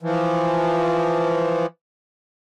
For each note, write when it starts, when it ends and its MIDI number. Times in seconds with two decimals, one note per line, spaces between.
0.02 1.66 52
0.02 1.66 53